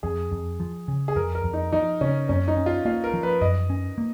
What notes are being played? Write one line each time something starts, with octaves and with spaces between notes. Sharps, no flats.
F2 G#4
F2
F3
C#3
G#4
F2 A#4
A#4
F2
D#4
F3 D#4
C#3 C#4
F#2 C#4
D#4
C#4
F4
A#3 F4
A#4
F3
B4
F#2 D#5
C#4
A#3